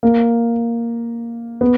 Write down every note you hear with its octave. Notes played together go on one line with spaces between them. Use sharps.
A#3
B3